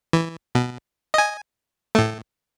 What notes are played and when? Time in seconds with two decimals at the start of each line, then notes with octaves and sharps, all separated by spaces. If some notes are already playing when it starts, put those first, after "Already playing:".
0.13 E3
0.55 B2
1.14 D#5 G#5
1.95 A2 A3